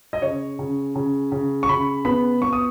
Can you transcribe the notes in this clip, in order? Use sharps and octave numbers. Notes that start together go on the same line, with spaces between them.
D#5
C#3 C#5
C#3
C#3
C#3
C#6
C#3 B5
B3 B5
B3 C#6
D#6